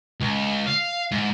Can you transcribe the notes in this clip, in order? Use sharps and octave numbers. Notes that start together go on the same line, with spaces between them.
C#2
F5
G#2